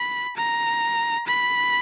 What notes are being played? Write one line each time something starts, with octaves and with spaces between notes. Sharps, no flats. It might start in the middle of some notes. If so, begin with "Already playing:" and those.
Already playing: B5
A#5
B5